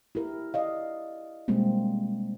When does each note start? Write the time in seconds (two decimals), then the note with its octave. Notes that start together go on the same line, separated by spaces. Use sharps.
0.15 E4 G4 A#4
0.54 D5 D#5 F5
1.48 B2 G3 G#3 A#3 C4